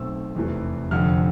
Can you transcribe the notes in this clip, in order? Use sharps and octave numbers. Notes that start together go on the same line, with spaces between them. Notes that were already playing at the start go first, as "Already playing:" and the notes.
Already playing: B1 B2 A3 C4 E6
F1 E2 C3 E3 A3
F1 F2 D3 F6